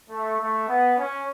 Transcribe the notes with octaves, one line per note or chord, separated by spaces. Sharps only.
A3
A3
B3
C#4